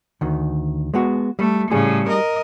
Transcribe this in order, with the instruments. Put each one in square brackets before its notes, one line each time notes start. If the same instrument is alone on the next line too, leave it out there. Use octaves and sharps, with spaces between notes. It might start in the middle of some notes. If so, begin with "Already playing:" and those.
[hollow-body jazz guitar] D2 D#3
G#3 B3 F#4
[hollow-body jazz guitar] G3 [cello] A3
[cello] A2 C#3 [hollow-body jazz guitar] G3 G#4
[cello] A#4 D#5